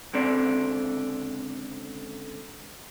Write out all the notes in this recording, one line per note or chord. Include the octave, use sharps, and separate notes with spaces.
C#2 D3 C4 D5